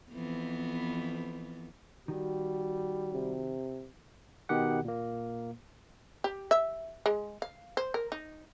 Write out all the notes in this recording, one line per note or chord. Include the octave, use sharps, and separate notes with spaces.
F2 E3 B3
D#3 G3 F#4
C3
B2 D#3 G4 F#5
A#2 A#3
G4
E5
G#3
F5
C5
A#4
D#4